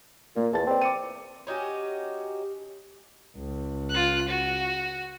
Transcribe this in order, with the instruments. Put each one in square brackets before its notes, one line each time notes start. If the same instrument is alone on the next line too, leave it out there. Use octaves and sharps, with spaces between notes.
[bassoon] A#2 [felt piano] A#3
[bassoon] E2 [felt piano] A5 A6
[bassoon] C4 [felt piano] B4 D5
[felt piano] D6 C#7 D#7
[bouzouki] C#4 D#4 F#4 G4
[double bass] C#2
[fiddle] F4 F#6
F#4